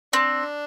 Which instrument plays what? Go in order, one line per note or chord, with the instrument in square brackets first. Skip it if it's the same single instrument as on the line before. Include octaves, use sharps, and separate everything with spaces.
[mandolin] C4 [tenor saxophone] D4